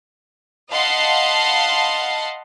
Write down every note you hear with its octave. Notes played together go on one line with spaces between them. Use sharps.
D#5 F5 F#5 A5 B5 C6